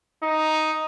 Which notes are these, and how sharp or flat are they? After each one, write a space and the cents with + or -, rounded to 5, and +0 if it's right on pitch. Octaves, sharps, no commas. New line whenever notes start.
D#4 +5